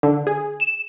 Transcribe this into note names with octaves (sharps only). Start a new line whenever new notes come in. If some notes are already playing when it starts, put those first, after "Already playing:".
D3
G#4
E7